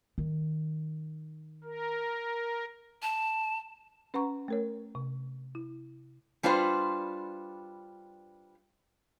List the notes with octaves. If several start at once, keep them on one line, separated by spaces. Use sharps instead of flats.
D#3
A#4
A5
C#4 B4 F#5 A#5 C#6
A3 A#4 C#5
C3
E4
G3 D4 F4 B4 C5